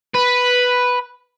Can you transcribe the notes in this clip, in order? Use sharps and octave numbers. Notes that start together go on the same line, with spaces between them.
B4